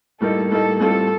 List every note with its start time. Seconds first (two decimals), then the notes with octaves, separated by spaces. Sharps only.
0.21 A2 G3 A#3 D#4 A4
0.50 A2 G3 A#3 D#4 A4
0.79 A2 G3 C4 F4 A4